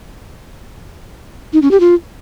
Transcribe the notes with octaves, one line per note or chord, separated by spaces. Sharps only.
D#4
C#4
G4
F4